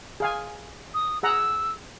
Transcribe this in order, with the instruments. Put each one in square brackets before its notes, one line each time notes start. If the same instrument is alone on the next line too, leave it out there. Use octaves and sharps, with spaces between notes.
[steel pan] G#4 F5 G#5
[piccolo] D#6
[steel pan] G#4 F#5 A#5 [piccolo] E6